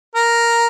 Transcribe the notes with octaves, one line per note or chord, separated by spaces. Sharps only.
A#4